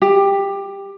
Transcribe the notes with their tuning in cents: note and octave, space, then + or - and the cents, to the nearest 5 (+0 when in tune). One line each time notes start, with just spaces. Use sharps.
G4 +15